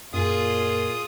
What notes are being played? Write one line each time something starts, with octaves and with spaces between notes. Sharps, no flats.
F#2 A#2 F4 G#4 D#6